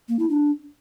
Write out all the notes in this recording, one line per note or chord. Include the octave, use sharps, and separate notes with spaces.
A#3
E4
D4